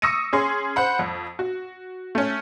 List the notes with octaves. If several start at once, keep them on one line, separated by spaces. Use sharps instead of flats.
C#6 D#6 E6 A#6 C#7 D#7
C#4 G#4 C6
C5 F#5 B5
F2
F#4
A3 C#4